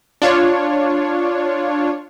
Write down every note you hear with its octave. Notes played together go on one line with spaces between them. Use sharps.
D4 F4 C#5